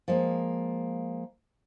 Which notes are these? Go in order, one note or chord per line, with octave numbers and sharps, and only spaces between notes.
F3 G#3 A#3